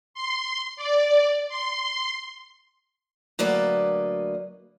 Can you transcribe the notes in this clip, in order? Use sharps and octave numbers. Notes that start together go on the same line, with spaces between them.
C6
D5
C6
D2 F#3 A#3 B4 D5 D#5